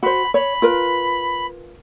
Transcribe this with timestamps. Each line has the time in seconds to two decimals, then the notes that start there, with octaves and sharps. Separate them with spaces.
0.03 F#4 C5 B5
0.34 C#5 B5
0.62 F4 A#4 B4